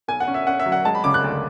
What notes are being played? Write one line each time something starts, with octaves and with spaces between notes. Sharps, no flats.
B1 G#5
F#5
C#4
E5
C#4 F#5
E5
F#3
F#5
G#3 A5
B5
C#3 D6
F#6
D2